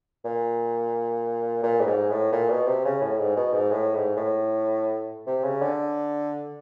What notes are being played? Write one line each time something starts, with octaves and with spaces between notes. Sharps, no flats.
A#2
A#2
A2
G#2
A2
A#2
B2
C3
C#3
A2
G#2
B2
G#2
A2
G#2
A2
C3
C#3
D3